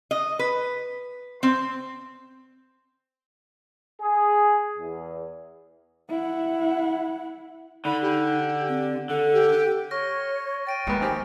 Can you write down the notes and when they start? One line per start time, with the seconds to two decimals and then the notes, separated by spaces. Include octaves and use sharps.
0.11 D#5
0.39 B4
1.43 C4
4.02 G#4
4.78 E2
6.09 E4 F#5
7.85 D3 D#4 B5
8.02 G4
8.68 C4
9.10 D3 A4
9.33 G4
9.91 C#5 C#6 F6 A#6
10.67 G5 A6 D7 D#7
10.87 A#1 G#3 A#3 B3
11.01 D#3 C4 G4 G#5